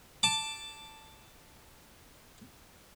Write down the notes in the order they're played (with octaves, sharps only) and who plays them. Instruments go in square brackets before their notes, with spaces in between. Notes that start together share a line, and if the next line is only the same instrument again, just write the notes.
[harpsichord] A5 D6